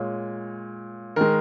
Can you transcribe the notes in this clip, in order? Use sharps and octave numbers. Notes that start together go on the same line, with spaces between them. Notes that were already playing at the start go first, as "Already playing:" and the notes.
Already playing: A#2 G#3 C#5
D#3 G#3 A#4